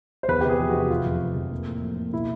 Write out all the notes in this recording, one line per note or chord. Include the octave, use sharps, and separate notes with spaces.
C5
E2 B4
G4
C3 G#4
F3
C3 F#4
F1 F4
F2
F1
F2
A#3
A2
F3
A#3
B2 E4